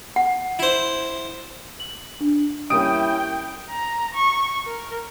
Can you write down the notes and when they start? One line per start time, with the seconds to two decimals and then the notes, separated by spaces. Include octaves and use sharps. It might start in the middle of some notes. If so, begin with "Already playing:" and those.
0.16 F#5
0.59 E4 C5
1.80 F#7
2.21 D4
2.70 G3 A#3 C#4 E4 G5 D#6 D7
3.70 A#5
4.15 C#6
4.67 A#4